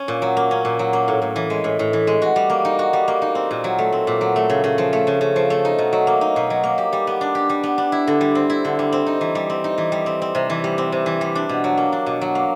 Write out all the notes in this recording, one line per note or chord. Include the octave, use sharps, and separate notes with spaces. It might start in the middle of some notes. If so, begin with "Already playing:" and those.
Already playing: C#4
A#2
F#3
A#3
C#4
A#2
F#3
A#3
A2
A2
E3
G#3
A2
A2
E3
G#3
F#4
G3
A#3
D#4
F#4
G3
A#3
D#4
C4
A#2
F#3
A3
C4
A#2
F#3
A3
C#3
C#3
F3
A3
C#3
C#3
F3
A3
D#4
B2
F#3
A#3
D#4
B2
F#3
A#3
G4
G3
B3
D4
G4
G3
B3
D4
E4
D3
G3
C4
E4
D3
G3
C4
D#4
E3
G3
C4
D#4
E3
G3
C4
C4
C3
E3
G3
C4
C3
E3
G3
D4
B2
F#3
A#3
D4
B2
F#3
A#3